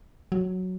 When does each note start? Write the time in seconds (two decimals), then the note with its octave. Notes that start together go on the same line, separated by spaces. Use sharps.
0.32 F#3